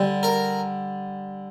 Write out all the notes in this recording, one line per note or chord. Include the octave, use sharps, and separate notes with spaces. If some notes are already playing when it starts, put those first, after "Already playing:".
Already playing: D3 G3
A#4